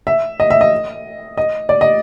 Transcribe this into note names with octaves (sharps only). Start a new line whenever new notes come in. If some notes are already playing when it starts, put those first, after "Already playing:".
E5
D#5
E5
D#5
D#5
D5
D#5